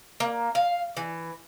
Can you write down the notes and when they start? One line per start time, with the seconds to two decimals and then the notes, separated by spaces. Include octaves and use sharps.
0.20 A#3
0.55 F5
0.97 E3